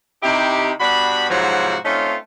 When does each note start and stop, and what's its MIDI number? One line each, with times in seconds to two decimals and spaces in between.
0.23 0.71 48
0.23 0.71 63
0.23 0.71 64
0.23 0.71 67
0.80 1.28 43
0.80 1.28 59
0.80 1.28 62
0.80 1.28 66
0.80 1.28 83
1.30 1.76 44
1.30 1.76 48
1.30 1.76 53
1.30 1.76 54
1.30 1.76 64
1.30 1.76 66
1.85 2.15 57
1.85 2.15 60
1.85 2.15 61
1.85 2.15 63
1.85 2.15 65